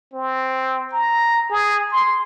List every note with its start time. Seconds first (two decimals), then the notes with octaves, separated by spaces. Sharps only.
0.13 C4
0.93 A#5
1.50 G#4
1.91 C6